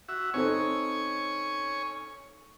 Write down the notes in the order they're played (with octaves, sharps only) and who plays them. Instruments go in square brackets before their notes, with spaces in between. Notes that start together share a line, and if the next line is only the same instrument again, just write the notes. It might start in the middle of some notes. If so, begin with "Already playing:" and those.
[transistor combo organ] F#4 E5
[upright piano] C4 D#4 A4 [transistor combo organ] C#5 G#5 C#6